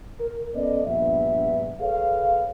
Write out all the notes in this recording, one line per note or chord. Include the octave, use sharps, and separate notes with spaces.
A#4
B3 C#4 A4 B4 D5 D#5
A#1 G2 B3 E5
G#4 A4 B4 C#5 F5